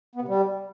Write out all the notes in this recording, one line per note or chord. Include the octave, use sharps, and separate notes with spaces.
B3
C3
G3